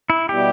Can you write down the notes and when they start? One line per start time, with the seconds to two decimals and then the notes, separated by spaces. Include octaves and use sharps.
0.10 E4
0.29 B2 G3 B3 E4 G4